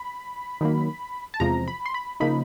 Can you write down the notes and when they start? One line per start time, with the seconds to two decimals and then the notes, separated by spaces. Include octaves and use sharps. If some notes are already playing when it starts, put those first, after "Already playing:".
Already playing: B5
0.61 D#3 F#3 A#3
1.34 A5
1.40 E2 C3 F3 G#3 A#5
1.68 B5
1.86 C6
1.94 B5
2.20 C#3 F3 A#3 D#4 B5